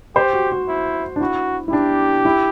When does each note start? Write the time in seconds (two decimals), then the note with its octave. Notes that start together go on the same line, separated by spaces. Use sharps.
0.16 G4 C5
0.33 F#4
0.51 F#4
0.68 E4
1.16 D4
1.20 E4 F#4
1.68 E4
1.72 D4 G4
2.25 E4